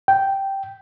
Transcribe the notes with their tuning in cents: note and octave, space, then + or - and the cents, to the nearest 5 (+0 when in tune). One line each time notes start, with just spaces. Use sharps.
G5 -5